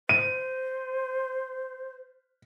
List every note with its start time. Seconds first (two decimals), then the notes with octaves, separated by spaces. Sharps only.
0.09 C5 D#7